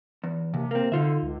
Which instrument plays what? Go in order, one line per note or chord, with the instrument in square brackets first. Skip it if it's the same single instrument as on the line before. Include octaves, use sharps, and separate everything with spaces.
[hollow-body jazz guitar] E2
[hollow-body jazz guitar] D#2 [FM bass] C3
[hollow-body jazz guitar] A#3 C4
[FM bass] D3 [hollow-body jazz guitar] D#4 F4 E5
[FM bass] C#2